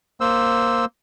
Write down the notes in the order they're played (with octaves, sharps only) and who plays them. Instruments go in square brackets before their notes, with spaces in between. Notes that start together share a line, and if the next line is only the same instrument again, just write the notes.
[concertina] A#3 C5 E6